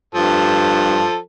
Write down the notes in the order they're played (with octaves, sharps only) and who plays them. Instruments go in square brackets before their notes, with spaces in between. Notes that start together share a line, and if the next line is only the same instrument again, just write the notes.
[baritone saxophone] G2 [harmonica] F3 A4